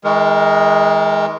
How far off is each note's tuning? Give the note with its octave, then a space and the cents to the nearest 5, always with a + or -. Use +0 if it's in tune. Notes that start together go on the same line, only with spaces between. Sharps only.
E3 -45 G#3 +0 A#4 +0